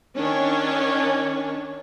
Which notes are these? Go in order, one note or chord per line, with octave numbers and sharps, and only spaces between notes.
D#3 C#4 D4 C#5